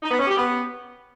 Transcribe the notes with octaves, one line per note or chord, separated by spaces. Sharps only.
D#4
B3
C#4
G4
B3